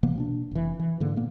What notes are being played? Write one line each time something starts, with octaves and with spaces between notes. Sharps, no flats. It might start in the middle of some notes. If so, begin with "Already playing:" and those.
C3 E3 A#3 B3
B2 C4 D4
F1 E3
E3
G#2 D3 A#3
A#2 A#3 B3